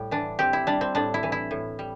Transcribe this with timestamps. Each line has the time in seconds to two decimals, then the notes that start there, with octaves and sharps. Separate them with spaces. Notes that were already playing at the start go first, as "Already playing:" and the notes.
Already playing: A2 G3 G4
0.11 E3 D4
0.39 C4 G4
0.53 E4
0.67 G3 D4
0.81 C4
0.95 A2 D4
1.14 E4
1.23 E3
1.32 E4
1.51 A2
1.79 G3